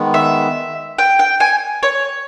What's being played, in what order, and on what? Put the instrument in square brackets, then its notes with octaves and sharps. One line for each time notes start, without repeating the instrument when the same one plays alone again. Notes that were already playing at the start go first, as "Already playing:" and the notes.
Already playing: [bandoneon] D#3 G#3 B3
[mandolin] E5
G5
G5
G#5
C#5